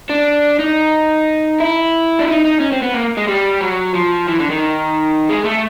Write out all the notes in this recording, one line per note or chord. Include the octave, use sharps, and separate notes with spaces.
D4
D#4
E4
D4
D#4
D#4
C#4
C4
B3
A#3
G#3
G3
F#3
F3
E3
D3
D#3
G#3
A3